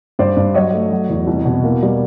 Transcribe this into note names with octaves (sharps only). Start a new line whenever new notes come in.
G2 C5 D5
G2
F#3 C#5 D#5
A3
F#3
E2
C2
B2
A#3
G3